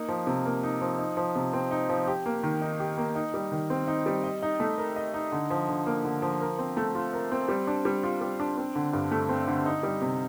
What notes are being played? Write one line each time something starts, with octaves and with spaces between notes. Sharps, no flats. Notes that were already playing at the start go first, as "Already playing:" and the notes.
Already playing: A#3 D#4
F3
C3
A#3
D#4
F3
D#4
F3
C3
C4
D#4
F3
G4
A#3
D#3
D#4
G4
A#3
D#4
G3
D#3
C4
D#4
G3
D#5
D#4
A3
A#4
D#5
D#4
D3
F3
D3
A#3
D3
F3
A#4
C4
A3
F4
A#4
C4
G3
D4
G3
F4
G3
D4
C4
D3
G2
A3
C4
D3
D#4
G3
C3